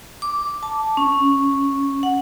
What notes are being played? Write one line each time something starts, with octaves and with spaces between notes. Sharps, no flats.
D6
A5
C#4
F#5